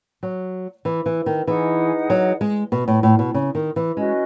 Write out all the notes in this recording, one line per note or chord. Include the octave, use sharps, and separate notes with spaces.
F#3
E3
E3
D#3
E3 D#4 G#4 D#5 F#5
F#3
G#3
B2
A2
A2
B2
C#3
D#3
E3
G#3 C#4 F#4 B4 D#5